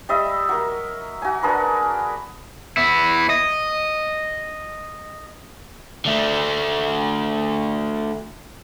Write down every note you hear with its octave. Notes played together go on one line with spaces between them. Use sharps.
G3 D#5 E5
F#3 A#4
F#4 G#5
D4 G#4 A#4 B4
B3 E4
D#5
D3 A3